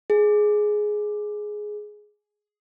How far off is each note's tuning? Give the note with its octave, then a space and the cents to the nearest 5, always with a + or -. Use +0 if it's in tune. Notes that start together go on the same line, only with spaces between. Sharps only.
G#4 +10